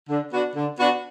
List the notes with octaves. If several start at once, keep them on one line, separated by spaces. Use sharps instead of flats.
D3
B3 D4 F#4
D3
B3 D4 F#4